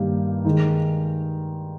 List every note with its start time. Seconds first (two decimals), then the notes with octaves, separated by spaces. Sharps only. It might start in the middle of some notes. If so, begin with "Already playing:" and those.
Already playing: G2 D#3 A#3 D#4 G4
0.45 D#3 G#3 D#4 G#4